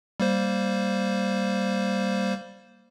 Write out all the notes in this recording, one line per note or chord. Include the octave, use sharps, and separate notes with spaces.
G3 A#3 C5